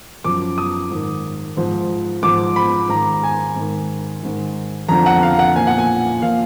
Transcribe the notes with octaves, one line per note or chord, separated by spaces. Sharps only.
F#2 F3 D6
D#6
G#2 D#3
G#2 F3
G#2 F3 D6
B5
G#2 D#3 A#5
G#5
G#2 D#3
G#2 D#3
F2 D3 F3 A#5
F#5
F5
F#5
A#2 F3 G#5
F#5
G#5
A#2 F3 F5